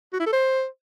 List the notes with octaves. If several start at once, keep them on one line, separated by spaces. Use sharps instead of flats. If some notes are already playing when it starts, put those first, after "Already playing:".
F#4
E4
A4
C5